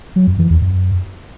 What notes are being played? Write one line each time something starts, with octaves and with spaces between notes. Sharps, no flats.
F#3
F#2
E3
E2
F#2